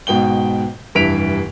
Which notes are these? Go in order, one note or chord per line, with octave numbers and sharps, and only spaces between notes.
G#2 B2 G5 G7
F1 G2 E3 B6 D7 F7